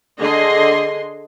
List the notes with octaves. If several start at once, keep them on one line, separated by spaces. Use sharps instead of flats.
D3 G#4 D#5 C6